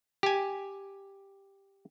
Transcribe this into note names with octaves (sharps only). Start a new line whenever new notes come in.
G4 G#5